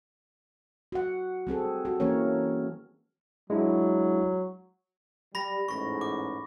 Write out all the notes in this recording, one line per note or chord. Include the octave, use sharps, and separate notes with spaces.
F#4 F#5
G3 C4 G#4 A4
F#4
E3 A#3 C#4 A#4 C#5
F#3 G#3 D4 E4
G3 B5 A#6
A1 E2 G#2 C#6 A#6
D6